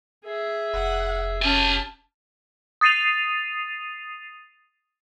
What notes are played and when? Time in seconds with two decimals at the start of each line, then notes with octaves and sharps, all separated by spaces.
0.25 G#4 E5
0.74 F1 F#5
1.42 C#4 G4 G#5 A5
2.81 D#6 A6 C7 D#7 F7